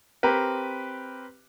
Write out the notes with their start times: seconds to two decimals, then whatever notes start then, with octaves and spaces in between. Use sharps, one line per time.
0.23 C4 G4 A#4 B4